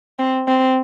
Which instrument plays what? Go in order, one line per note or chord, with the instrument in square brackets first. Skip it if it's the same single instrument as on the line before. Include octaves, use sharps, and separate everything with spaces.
[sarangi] C4
C4